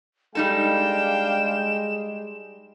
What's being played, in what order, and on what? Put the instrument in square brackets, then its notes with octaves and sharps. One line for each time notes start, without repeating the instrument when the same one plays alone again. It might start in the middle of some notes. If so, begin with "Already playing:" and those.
[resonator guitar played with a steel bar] G3 D#4 A4 [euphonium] G#3 [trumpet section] D4 F5 G5 [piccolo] E7